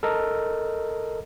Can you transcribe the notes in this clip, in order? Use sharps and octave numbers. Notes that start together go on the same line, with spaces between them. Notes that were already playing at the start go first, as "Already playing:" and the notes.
A4 A#4 D#5